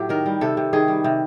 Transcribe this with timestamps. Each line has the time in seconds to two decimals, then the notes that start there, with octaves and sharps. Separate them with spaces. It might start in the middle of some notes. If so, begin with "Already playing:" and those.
Already playing: A2 F#3 G4
0.09 D#3 A#4
0.26 G3
0.41 C3 A4
0.57 C3
0.73 D#3 G#4
0.88 G3
1.04 C3